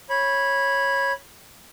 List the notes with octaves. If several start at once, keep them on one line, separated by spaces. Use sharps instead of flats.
C#5 B5